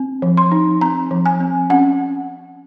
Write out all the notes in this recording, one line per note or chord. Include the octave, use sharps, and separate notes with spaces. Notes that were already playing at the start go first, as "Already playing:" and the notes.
Already playing: C4
F3
C6
D#4
C4 A#5
F3
G#5
C4
C#4 F#5